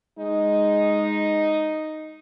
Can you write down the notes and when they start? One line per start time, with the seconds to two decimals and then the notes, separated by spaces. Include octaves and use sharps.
0.19 G#3 D#4